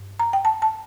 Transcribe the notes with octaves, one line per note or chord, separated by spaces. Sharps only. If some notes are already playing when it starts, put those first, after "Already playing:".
Already playing: G2
A#5
G5
A5
A5